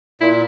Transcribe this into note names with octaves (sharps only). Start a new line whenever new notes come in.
A#2 E4